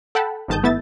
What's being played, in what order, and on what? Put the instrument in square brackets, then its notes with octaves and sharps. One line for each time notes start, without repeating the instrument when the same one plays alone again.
[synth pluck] A4 F#5 G5 A5 B5
G1 G#2 D#3 A5 D#6 G6
A3 B3 E4 E5 A6